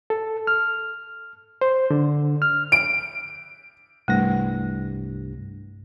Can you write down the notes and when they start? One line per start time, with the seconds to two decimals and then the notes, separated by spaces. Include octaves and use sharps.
0.10 A4
0.47 F6
1.61 C5
1.91 D3
2.42 F6
2.72 D7
4.08 C2 G2 A3 A#6